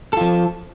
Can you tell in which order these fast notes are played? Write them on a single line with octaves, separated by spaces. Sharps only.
A4 F4 F3